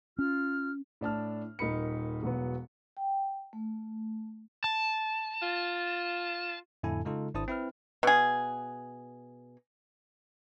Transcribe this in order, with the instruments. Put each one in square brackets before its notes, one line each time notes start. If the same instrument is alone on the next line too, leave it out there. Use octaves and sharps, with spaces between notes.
[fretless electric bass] C#4 [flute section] F4 F6
[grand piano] A2 D4 A5 F6
D#1 D#4 A#4 B5 C#7
E1 F#3 B3
[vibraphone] G5
A3
[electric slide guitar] A5
[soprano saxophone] F4
[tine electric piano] F2 A2 D3 E4 A4 G#5
C#3 G#3 D#4 F4 A4
G#1 D4 E4 C5 A5 D#6
C4 E4 B4 F6
[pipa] B2 G#4